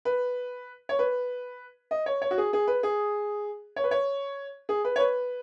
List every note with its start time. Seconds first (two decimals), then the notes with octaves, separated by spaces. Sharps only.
0.05 B4
0.89 C#5
0.99 B4
1.91 D#5
2.06 C#5
2.22 C#5
2.31 F#4
2.38 G#4
2.53 G#4
2.67 B4
2.83 G#4
3.76 C#5
3.84 B4
3.91 C#5
4.69 G#4
4.85 B4
4.96 C#5
4.99 B4